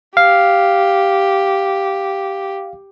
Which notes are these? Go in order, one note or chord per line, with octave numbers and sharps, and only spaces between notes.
G4 F5